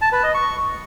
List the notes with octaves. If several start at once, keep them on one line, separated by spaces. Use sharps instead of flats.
A5
B4
D#5
C#6